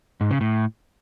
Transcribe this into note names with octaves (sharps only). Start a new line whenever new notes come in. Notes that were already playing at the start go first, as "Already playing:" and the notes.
G#2
C#3
A2